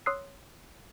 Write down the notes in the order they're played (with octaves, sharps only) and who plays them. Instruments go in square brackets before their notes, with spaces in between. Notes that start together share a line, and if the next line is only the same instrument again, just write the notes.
[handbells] C#5 C6 D#6 E6 F#6 C7